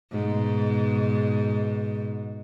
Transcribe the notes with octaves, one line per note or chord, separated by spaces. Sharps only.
G#2 B2